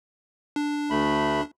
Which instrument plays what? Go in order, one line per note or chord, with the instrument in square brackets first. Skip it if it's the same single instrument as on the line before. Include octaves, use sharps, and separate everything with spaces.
[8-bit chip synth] D4
[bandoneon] D2 A3 B5